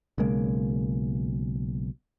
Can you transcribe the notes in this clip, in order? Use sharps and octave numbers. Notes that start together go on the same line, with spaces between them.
B1 C#3 G#3 A#3